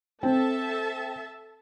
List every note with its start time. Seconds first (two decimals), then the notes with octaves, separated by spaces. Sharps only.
0.23 C4 A4 E5 A5